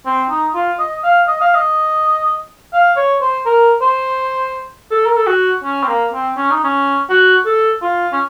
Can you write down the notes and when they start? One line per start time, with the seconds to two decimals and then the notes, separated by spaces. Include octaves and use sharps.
0.06 C4
0.30 D#4
0.54 F4
0.79 D#5
1.04 F5
1.28 D#5
1.41 F5
1.54 D#5
2.73 F5
2.97 C#5
3.21 C5
3.46 A#4
3.82 C5
4.91 A4
5.05 A#4
5.16 A4
5.27 F#4
5.64 C#4
5.83 C4
5.88 A#3
6.12 C4
6.37 C#4
6.51 D#4
6.64 C#4
7.10 F#4
7.46 A4
7.82 F4
8.13 C#4